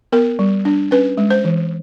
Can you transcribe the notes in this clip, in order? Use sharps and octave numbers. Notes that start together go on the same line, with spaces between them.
B3 A#4
G3
D4
C#4 B4
G#3
C5
E3